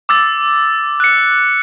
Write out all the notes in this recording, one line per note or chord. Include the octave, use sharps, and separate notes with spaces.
D6 E6 A6
F#6 C#7